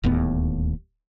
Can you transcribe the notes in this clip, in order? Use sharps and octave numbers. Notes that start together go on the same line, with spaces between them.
D1 D#2 A2 B3